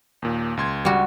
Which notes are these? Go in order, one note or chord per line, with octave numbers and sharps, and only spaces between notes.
D#2 A#2
C#2 C6 G#6
G3 F#4